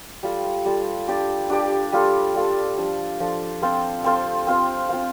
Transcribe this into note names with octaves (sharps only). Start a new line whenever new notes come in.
G3 F4 A4
G3 F4 A4
D4 G4 D5
D4 G4 D5
G3 F4 A4
G3 F4 A4
F3 D4 A4
F3 D4 A4
C4 A4 C5 F5
C4 A4 C5 F5
C4 F4 C5 F5
C4 F4 C5 F5